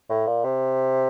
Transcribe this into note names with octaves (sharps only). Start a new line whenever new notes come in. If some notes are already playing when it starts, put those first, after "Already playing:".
A2
A#2
C3